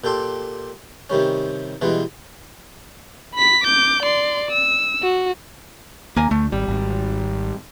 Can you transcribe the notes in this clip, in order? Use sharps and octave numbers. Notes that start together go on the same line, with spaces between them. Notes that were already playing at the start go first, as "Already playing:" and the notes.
A#2 G4 A4 G5 C6
C3 D#3 G3 C#4
B2 E3 G3 G#3
B5 B6
D6 G6
D5 C6
E6
F#4
D#2 A#3 G#5 A#5
D2 A3
G#1 G3
G#1